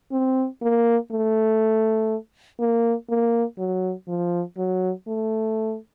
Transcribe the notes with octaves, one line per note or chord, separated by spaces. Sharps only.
C4
A#3
A3
A#3
A#3
F#3
F3
F#3
A3